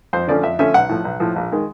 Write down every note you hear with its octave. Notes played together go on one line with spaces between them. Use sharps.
F2 C5
D3 F3 A3 C#4 D5
F2 E5
D3 F3 A3 C#4 E5
B1 F#5
A2 F3
B1
A2 F3
A#1
D#3 G#3